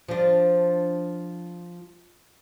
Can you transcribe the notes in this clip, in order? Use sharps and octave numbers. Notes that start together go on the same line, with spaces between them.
F3 D4